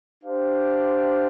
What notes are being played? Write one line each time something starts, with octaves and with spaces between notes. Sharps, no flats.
D4 G4 C5 F5